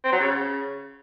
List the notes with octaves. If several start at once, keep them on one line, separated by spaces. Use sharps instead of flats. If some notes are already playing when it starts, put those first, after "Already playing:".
C4
F#3
C#3